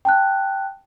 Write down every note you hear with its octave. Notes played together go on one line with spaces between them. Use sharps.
G5 A5 F#6